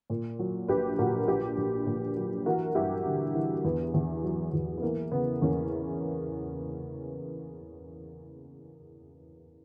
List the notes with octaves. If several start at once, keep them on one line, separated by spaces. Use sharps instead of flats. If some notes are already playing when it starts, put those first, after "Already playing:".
A#2
F#3
A#1 G4 B4
A#2 F#4 A#4
A#1 G4 B4
A#1
A#2
F#3
E3 F#4 A#4
G2 E4 G4
G1
E3
E2 B3
E2
F#3
E2
B3
E3 A#3
C#3 B3
E2 A#3 C#4